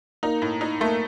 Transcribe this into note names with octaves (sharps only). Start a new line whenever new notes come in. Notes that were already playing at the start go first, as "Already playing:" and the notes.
A#3 D#4
A2
D#4
A3 A#3